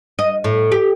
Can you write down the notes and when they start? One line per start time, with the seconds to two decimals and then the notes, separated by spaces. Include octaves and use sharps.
0.19 D#5
0.44 A2
0.72 G4